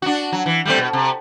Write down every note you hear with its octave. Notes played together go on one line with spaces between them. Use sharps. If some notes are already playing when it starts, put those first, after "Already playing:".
D4 F#4
F#3
E3
G3 A3 C4
B2
C3